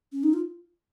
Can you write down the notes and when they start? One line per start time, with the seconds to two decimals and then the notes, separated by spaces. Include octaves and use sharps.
0.12 C#4
0.23 D#4
0.33 F4